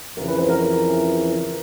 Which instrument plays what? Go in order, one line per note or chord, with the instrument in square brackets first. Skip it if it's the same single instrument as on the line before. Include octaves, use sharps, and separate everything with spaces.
[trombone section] F2 C#3 E3 [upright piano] A#4
[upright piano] B4
C5
A#4